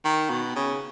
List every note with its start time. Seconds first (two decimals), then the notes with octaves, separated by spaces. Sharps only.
0.05 D#3
0.30 B2
0.56 C#3